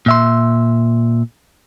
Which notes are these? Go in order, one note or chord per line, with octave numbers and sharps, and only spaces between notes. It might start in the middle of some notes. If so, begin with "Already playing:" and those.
A#2 E5 C6